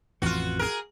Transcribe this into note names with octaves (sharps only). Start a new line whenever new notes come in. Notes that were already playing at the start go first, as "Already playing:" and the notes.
A1 F2 E3 F4 F#4
G#4 A#4